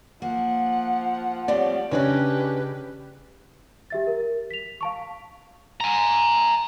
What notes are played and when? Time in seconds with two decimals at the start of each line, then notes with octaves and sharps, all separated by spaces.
0.22 F3 A#3 F#5
1.48 G3 A3 C4 C#5 D5
1.91 C#3 C#4 D4 G4 G#4 B4 C#5 D#5
3.90 G4 E5 A6
4.07 A#4
4.51 B6 F7
4.81 F5 A5 C#6
5.81 G#5 A#5